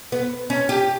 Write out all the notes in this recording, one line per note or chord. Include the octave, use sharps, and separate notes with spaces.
B3
C#4
G4